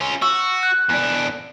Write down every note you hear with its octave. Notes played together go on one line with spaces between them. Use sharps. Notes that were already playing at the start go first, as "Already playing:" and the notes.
C#4 F4
F#4 C#6 E6
F#6
E2 D4